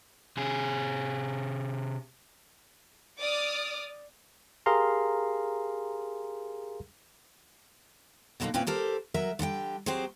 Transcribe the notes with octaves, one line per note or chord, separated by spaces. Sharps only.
C3 G#4
D5 D6 D#6 F6
G4 G#4 A#4 F5 A#5 C6
B2 D3 F#3 G#3 A#3 D#4
A#2 C4 C#4 E4 B4 G5
G4 A4 A#4 C5
F#3 A#4 E5
D3 G3 F#5 G5
F#3 C4 G4 G#4 C5